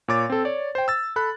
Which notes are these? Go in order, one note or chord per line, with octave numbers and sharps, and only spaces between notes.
A#2 C#5 D6 A6
C4 A4
C#5 D5
C5 G5
E6 A6
A4 B5 F#6